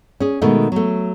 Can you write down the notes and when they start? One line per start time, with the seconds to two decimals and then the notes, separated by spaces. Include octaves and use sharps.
0.20 C#4 G#4
0.42 B2 D#3 G#3 A3
0.72 F#3 A3